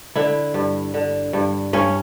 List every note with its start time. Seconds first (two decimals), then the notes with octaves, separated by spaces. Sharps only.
0.16 D3 E4
0.54 G2
0.94 D3
1.33 G2
1.73 G2 C#4